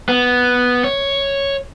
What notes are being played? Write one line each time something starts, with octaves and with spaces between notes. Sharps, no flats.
B3
C#5